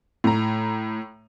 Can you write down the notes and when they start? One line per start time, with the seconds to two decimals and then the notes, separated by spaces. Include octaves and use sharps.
0.24 A2 A#5